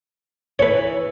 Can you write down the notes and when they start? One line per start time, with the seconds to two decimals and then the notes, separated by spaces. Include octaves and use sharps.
0.59 E3 B4 C#5